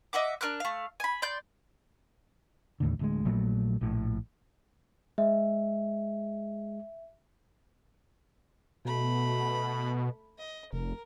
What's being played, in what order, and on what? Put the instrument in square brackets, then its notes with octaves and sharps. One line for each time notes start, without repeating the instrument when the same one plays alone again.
[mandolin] D#5 E5 F#5 D6
D4 A#4 F6 F#6
A3 F5
G#5 B5
D5 C6 G6
[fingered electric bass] D#2 A2 D3
D1 D2 G#3
A#1 A#2 F#3 A3
A#1 A2
[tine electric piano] G#3 [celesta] E5
[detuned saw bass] B2 [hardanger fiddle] A3 B5
[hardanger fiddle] D#5
[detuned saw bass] F1 [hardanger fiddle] A#4